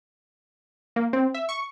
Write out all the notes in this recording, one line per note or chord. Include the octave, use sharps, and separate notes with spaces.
A#3
C4
E5
C#6